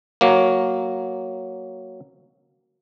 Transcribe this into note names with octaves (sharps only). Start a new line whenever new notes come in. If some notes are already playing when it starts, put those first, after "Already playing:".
F#3 A#3